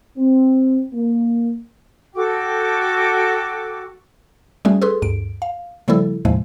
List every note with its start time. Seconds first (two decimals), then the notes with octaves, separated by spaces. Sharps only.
0.17 C4
0.93 A#3
2.15 F#4 A4 G5 D6
4.65 G3 A3 C#4 F#4 G#4
4.82 G#4 A4 B4 C6
5.02 D2 G2 D7
5.42 F5
5.88 C#3 F3 G3 A3 E4 A4
6.25 D#2 A2 C3 F3 G#3